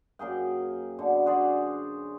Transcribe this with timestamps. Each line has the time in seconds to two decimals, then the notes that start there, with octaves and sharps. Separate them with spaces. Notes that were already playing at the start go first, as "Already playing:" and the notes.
0.19 F#2 A#3 G#4 G5
0.99 B2 D3
1.26 F#4 G#4 C5 D5